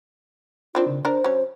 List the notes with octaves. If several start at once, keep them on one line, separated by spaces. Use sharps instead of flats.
D#3 C4 D4 F4
C#3
D4 A#4 C5
F#3 C#4